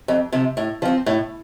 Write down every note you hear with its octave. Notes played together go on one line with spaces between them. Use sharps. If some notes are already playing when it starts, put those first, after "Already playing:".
F2
C3 F3
A2
F3 C4
A2